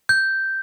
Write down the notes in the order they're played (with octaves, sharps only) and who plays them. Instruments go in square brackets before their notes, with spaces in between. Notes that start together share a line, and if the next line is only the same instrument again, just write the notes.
[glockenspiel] G6